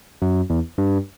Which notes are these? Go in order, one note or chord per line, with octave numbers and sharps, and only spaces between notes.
F#2
E2
G2